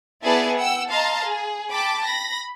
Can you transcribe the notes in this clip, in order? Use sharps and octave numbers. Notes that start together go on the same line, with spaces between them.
B3 E4 G#4 D5 G#5 A5
F#5 G5 E6
D#5 F5 A5 A#5 C6
G#4
G5 A5 B5 D6
B5 A#6